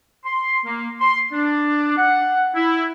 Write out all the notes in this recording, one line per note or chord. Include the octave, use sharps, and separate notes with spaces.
C6
A#3
C6
D4
F#5
E4